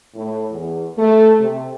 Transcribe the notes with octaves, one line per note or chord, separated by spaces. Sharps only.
A2
E2
A3
C3